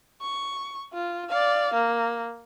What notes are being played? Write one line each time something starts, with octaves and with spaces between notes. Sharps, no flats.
C#6
F4
D5 F5
A#3